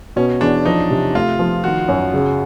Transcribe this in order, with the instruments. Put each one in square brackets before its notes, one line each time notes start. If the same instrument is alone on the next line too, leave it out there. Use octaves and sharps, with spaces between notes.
[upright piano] B2 [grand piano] C#4
[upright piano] E2 [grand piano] D4
[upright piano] F3 [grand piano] D#4
[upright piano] C3
[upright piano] A3 [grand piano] F4
[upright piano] F3
[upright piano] D#3 [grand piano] F#4
[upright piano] F#2
C#3